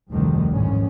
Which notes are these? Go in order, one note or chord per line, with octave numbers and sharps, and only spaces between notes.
F1 D2 G2 D3 D#3 F3
A1 G#2 D#3 C#4